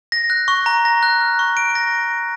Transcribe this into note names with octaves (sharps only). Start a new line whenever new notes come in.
A#6
F#6
C#6
A#5
A#6
F#6
F6
C#6
D7
A#6